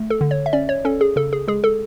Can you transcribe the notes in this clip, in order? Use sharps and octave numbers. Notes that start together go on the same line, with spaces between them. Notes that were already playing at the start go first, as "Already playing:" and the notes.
Already playing: A3
A4
D3
C#5
E5
C#4 D5
C#5
C#4 A4
G#4
C#3 A4
G#4
G#3 G#4
A4